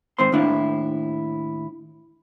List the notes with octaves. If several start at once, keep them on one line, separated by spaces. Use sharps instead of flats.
G#2 D#3 C4 C5 C6
D#2 A2 D4 E4 F5